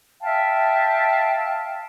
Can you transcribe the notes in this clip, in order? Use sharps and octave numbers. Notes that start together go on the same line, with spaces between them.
E5 F5 G5 A5